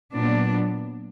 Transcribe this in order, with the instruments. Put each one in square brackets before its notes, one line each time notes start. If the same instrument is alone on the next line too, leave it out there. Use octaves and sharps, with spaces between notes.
[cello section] A#2 F#3 B3 D4